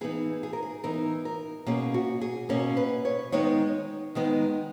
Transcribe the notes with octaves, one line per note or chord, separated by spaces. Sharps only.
E3 B3 D#4 G#4
G#4
A#4
G#4
E3 B3 D#4 A#4
A#4
B2 A#3 C#4 G#4
F#4
G#4
B2 A#3 C#4 A#4
B4
C#5
D#3 G#3 B3 D#4 C#5
D#3 G#3 B3 D#4